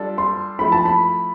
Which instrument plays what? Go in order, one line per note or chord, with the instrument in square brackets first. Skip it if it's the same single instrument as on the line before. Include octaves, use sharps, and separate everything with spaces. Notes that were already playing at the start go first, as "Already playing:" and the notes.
Already playing: [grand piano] G3 D4 F4 A4
[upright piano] C6
[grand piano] F3 A3 E4 [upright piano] B5
[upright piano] A5
B5